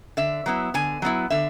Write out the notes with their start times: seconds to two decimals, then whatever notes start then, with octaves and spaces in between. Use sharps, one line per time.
0.17 D3 E5
0.46 F#3 B3 E4
0.74 D3 G#5
1.02 F#3 B3 E4
1.30 D3 E5